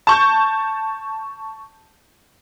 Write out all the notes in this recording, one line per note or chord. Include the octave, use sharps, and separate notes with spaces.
A5 C#6 G6